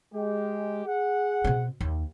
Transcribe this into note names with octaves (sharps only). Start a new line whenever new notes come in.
G#3 G4
G#4 F#5
B2 C4
D#2